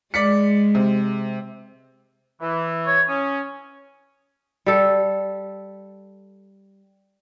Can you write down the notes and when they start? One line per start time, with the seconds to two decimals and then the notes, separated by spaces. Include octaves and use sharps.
0.14 G#3 D5 B6 C#7
0.75 C3
2.41 E3
2.87 C#5
3.09 C#4 D#6
4.66 G3 A4